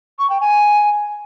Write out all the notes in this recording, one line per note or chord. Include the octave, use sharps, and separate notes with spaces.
C#6
G5
G#5